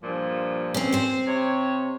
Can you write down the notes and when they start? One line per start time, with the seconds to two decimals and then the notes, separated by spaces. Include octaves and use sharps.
0.02 G2 A#2 F3
0.74 C4 C#4
0.93 C4 C5
1.26 C3 C#5